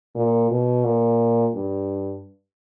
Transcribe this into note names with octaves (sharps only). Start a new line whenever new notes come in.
A#2
B2
A#2
G2